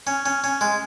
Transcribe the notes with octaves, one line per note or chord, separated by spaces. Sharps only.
C#4
C#4
C#4
G#3